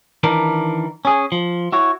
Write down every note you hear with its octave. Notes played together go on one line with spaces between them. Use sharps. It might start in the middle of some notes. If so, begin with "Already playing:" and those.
D#3 E3 D4 A#4
C#4 G#4
F3
E4 F#4 C#5